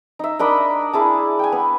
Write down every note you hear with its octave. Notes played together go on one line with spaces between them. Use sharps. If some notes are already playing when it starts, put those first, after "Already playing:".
D#4 E5
D4 A#4 D#5 B5
E4 G#4 A5
G5 G#5
B3